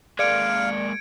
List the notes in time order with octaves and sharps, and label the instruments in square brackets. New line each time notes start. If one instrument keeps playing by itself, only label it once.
[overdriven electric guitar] G#3 A#3 [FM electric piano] D5 [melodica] F5 [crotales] G#6 C#7 D7